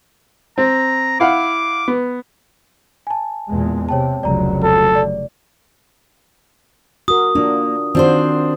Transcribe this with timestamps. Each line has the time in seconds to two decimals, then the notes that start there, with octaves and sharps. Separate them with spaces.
0.58 C4 A#5
1.20 E4 F5 F#5 D6
1.88 B3
3.07 G#5 A5
3.50 E2 A#2 G#3
3.89 C3 C#5 G5 A5
4.23 F1 C#2 F#3 D5 A#5
4.63 A4
4.95 D5
7.08 F#4 A#4 D#6
7.35 A#3 D4 F4
7.95 D#3 C4 D4 F4 F#4 C5